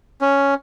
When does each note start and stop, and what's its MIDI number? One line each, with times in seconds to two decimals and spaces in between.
0.21 0.54 61